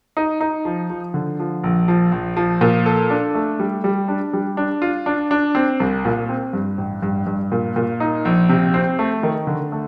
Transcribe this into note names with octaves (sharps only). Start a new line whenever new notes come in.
D#4
D#4
F3
F3
D3
F3
A#1
F3
A#1
F3
A#2
A4
D4
A3
G3
G3
D4
G3
D4
F4
D4
D4
C4
C2
A#2
C4
G2
A1
G2
G2
A#2
A#2
D#4
A#1
C3
C4
A3
D#3
D3
A3